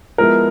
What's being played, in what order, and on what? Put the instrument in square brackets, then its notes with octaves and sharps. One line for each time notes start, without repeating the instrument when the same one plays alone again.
[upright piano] F3 G#3 B3 E4 [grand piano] A#4